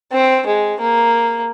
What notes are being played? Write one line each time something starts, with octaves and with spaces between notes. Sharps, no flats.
C4
G#3
A#3